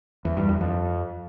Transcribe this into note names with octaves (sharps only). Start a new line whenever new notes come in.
E2
G2
E2
F2